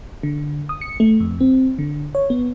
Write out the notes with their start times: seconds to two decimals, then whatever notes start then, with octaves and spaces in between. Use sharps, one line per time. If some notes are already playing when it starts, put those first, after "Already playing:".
0.23 D3
0.69 D#6
0.81 C#7
1.00 A3
1.20 F2
1.41 C4
1.79 D3
2.15 C#5
2.30 B3